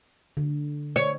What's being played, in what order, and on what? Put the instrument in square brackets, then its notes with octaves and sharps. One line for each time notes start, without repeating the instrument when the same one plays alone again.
[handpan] D3
[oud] C#5